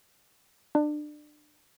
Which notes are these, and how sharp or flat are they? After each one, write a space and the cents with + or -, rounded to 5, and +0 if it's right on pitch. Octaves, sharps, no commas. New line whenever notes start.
D4 +30